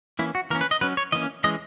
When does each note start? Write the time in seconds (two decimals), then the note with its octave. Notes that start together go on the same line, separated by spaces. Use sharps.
0.19 E3 A#3 C#4 E4
0.35 F#4
0.50 E3 A#3 C#4 A#4
0.61 B4
0.71 D#5
0.81 F#3 C#4 B4
0.97 C#5
1.12 E3 A#3 C#4 D#5
1.44 E3 G#3 C#4 D#5